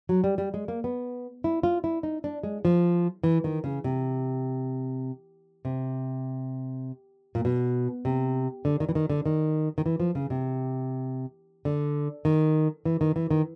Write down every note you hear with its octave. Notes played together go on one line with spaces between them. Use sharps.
F#3
G3
G3
G#3
A#3
B3
E4
F4
E4
D#4
D4
G#3
F3
E3
D#3
C#3
C3
C3
A#2
B2
C3
D3
D#3
E3
D#3
D3
D#3
D#3
E3
F3
C#3
C3
D3
D#3
E3
D#3
E3
D#3